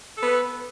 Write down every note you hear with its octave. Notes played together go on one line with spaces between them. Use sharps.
B3 A4 B4